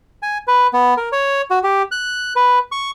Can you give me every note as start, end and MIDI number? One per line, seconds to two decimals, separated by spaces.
0.22 0.38 80
0.48 0.67 71
0.73 0.94 59
0.97 1.09 70
1.12 1.42 73
1.51 1.59 66
1.63 1.82 67
1.92 2.33 90
2.36 2.59 71
2.72 2.91 85